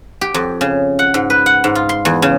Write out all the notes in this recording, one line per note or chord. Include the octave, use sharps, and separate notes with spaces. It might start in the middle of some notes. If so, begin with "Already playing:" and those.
G4
F2
C#3
F#5
G#2
B4
F#5
G#2
F4
C6
E2
C#3